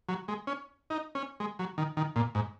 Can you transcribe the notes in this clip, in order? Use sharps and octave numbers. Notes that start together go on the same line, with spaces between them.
F#3
G#3
C#4
D#4
C#4
G#3
F#3
D#3
D#3
A#2
G#2